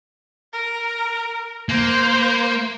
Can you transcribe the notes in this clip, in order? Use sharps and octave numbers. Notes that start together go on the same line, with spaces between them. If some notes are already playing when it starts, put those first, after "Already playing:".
A#4
A#3 C5